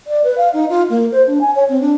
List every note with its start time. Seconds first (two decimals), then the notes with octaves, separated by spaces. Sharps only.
0.07 D5
0.24 B4
0.38 F5
0.53 D#4
0.69 F4
0.90 A#3
1.12 C5
1.27 D4
1.41 G#5
1.55 C#5
1.69 C4
1.81 D4